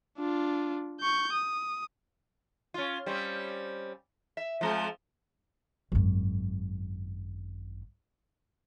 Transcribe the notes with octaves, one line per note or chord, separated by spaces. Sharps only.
D4 F4
C#6 G6
D#6
C#4 F4
G3 C4 C#4
E5
F3 G#3 C4
G#1 F#2